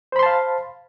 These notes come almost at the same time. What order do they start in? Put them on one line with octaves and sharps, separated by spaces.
C5 B5 C6 A5 F5